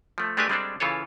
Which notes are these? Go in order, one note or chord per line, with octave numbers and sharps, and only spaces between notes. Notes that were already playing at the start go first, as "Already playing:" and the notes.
F3 A3
G#3 A3 D4 G4 B4 G#5
G3 G#3 C4 D4 G#4 A4
C#3 E3 F4 A4 C#5